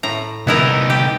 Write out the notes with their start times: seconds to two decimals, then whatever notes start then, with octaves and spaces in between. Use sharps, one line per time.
0.03 A2 A#5
0.47 C2 B3 D#4 E4 A#4
0.90 G4